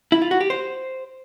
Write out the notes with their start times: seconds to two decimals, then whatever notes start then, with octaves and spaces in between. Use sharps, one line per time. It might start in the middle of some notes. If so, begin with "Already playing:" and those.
0.12 E4
0.22 F4
0.31 F#4
0.41 G4
0.50 C5